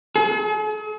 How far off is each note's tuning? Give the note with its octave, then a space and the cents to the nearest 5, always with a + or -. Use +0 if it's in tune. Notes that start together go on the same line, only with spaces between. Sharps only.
G#4 +45